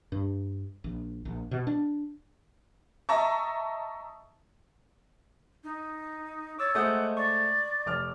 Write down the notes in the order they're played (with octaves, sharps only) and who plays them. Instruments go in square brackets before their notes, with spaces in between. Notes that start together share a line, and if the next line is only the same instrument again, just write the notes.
[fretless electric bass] G2
A#1
A#1
B2
D4
[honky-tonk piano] D#5 E5 A5 A#5 C#6
[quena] D#4
[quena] C#5 [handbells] D6 E6 A6
[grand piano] G#3 A3 C5 [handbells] D#5 D#6 G6 [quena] F#5
[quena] D5 [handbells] C#6
[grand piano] F1 D6 F6